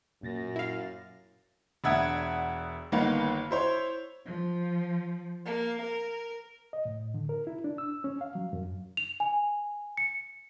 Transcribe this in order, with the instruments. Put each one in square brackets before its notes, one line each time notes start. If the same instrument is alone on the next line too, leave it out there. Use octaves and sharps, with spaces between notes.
[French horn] F#2 [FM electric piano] A#2 A6 A#6
[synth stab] E4 F5
[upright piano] E1 D4 E5 F#5 D#6 G#6
G1 D#3 A#3 B3 F5
E4 C5 C#5
[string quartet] F3
A#3
A#4
[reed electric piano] D#5
A2
D3
A#4
E4
D4
E6
C#4
F5
F#3
F#2
[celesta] F7
G#5
C#7